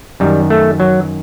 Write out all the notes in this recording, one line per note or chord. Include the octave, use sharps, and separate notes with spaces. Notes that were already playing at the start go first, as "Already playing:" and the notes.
F#2 D#3 G3
A3
F#3